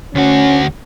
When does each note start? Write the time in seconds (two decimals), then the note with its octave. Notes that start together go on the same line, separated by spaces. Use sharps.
0.15 D2 C#4 F#4